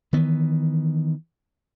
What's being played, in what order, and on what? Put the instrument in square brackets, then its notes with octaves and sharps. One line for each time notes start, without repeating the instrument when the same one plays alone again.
[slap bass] D#3 E3 B3